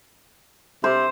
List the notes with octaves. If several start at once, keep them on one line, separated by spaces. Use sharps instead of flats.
C3 C5